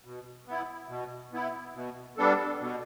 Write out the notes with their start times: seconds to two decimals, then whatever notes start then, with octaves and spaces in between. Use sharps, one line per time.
0.04 B2
0.47 B3 E4
0.89 B2
1.33 B3 E4
1.75 B2
2.18 G3 B3 D4 A4
2.61 B2